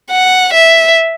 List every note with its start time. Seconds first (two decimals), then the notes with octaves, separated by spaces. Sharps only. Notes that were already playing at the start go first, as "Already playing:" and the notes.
0.11 F#5
0.53 E5